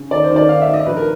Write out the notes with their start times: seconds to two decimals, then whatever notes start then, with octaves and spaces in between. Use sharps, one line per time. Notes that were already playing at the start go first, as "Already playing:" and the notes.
Already playing: C#3
0.11 D#2 D5
0.24 C5
0.30 D#3
0.36 D5
0.49 D#3 F5
0.61 E5
0.68 D#3
0.73 D#5
0.86 A#1 B4
0.97 A#4